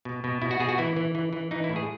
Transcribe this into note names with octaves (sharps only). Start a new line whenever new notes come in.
B2
B2
B2 E4
F#4
B2 G#4
F#4
E3 E4
E3
E3
E3
E3 D#4
E4
A2
G#4